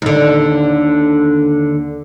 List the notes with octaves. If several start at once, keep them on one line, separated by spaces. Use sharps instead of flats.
D#2 D3